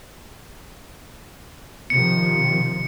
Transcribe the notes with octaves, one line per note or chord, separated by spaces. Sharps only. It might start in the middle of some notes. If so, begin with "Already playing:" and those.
C3 D#3 F3 C#7